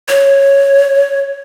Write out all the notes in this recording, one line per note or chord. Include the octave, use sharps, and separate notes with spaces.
C#5